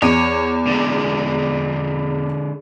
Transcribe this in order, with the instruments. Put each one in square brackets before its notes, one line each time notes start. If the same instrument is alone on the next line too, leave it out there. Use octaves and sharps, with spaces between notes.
[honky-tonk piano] E2 D#7 [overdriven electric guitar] C#5
[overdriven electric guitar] D3 G#3